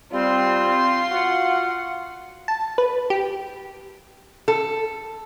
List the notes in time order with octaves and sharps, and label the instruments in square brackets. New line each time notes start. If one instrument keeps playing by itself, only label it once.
[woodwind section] G3 C4 [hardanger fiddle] F4 C6
[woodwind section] F#4 F5 F#5
[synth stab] A5
B4
G4
[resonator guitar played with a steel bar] A4